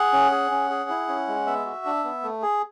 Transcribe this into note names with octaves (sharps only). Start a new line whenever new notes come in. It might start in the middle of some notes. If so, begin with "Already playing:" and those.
Already playing: G#4 F#5
C#4
G#4
C#4
G#4
E4
C#4
G#3
B3 E5
F#4
D4
B3
A3
G#4